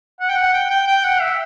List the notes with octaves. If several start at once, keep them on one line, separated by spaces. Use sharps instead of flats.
F#5
G5
F#5
G5
G5
G5
F#5
E5